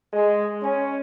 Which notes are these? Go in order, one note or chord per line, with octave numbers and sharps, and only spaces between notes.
G#3
C#4